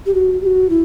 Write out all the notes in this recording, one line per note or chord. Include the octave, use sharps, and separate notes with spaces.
G4
F#4
G4
F#4
E4